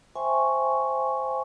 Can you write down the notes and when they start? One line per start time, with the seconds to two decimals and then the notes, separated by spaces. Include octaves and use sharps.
0.16 C5 E5 G5 G#5 C6 C#6